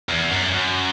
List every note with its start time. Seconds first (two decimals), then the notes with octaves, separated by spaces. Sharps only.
0.09 E2
0.30 F#2
0.52 F#2